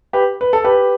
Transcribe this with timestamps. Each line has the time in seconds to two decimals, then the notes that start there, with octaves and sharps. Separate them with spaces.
0.13 G4 B4
0.41 B4
0.53 A4
0.64 G4 B4